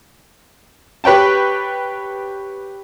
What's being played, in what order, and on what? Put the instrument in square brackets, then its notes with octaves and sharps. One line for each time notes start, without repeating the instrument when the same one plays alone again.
[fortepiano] G4 B4 C#5 G5 A5